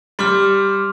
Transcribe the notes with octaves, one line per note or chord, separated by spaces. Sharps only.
G3 C6 D6 F6